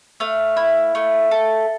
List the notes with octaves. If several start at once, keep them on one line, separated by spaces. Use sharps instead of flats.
A3 F5
E4
A3
A4